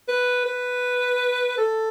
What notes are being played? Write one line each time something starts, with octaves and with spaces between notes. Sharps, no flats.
B4
B4
A4